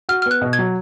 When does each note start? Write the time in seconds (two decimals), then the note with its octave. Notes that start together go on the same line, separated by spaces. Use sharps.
0.09 F#4 F6
0.22 F6
0.26 B3
0.31 F#6
0.41 B2
0.53 G#6
0.59 F#3